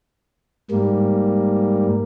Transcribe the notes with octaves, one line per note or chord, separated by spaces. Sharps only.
G#2 G3 A#3